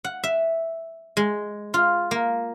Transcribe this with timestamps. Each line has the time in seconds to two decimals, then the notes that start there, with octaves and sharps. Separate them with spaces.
0.04 F#5
0.24 E5
1.17 G#3
1.74 F4
2.11 A#3